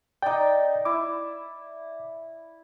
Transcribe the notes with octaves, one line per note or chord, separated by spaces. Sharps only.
D#4 D5 D#5 G5
E4 D6